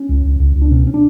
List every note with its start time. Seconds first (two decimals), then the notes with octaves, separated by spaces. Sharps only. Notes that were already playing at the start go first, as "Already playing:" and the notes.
Already playing: C#4
0.09 C#2
0.25 C#2
0.40 C#2
0.56 C#2
0.62 D4
0.71 B2 C#4
0.87 C#4
0.94 D4